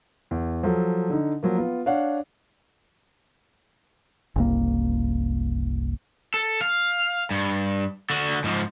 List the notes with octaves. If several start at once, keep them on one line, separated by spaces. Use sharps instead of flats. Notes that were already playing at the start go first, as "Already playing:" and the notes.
E2
F3 F#3 A4
D3 D#4
F3 F#3 A#3
B3 F4
D4 C#5 F5 F#5
F#1 C2 A#3
A4
F5
G2
D3 F#4
G#2 F3